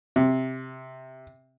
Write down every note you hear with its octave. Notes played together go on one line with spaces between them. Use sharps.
C3